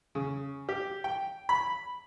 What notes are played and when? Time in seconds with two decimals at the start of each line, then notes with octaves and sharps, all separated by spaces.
0.15 C#3
0.69 G4
1.04 G5
1.49 B5